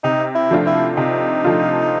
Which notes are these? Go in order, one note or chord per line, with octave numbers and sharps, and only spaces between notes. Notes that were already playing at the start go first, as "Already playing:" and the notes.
C3 D#4
E4
F3 A3 D4 F4
E4
C3 D#4
F3 A3 D4 F4